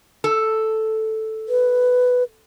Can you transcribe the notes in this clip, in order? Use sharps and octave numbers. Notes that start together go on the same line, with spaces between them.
A4
B4